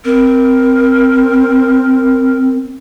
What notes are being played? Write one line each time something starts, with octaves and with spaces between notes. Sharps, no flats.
C4 A#4